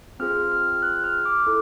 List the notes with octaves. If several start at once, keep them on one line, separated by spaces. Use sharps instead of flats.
C4 F4 G#4 F6
F6
F#6
F6
D6
E4 A4